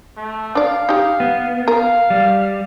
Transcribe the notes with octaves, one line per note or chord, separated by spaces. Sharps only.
A3
D4 D5 F5
D#4 G4
B3
A#4 F5
G3